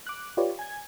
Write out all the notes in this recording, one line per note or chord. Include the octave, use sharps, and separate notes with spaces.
D6 F#6
F4 G4 B4 C#5 D5
G#5 G#6